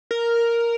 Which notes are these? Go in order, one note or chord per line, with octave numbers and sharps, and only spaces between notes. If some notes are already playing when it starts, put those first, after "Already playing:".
A#4